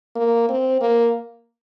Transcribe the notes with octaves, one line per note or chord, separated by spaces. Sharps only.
A#3
C4
A#3